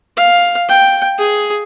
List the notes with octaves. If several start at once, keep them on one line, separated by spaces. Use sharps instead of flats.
F5
G5
G#4